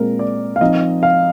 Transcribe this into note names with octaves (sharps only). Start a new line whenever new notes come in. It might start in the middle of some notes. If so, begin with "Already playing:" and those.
Already playing: A#2 G#3 C4 A#4
D5
F5
F3 C4 D#4 D#5
F5